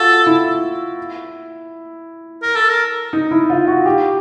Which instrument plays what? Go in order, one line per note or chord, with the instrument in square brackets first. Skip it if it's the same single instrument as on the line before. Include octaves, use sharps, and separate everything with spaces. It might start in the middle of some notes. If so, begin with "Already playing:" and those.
Already playing: [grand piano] F4 F#4 [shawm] A4
[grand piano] E4
[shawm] A#4
A4
A#4
[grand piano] D#4
E4
F4
F#4
G4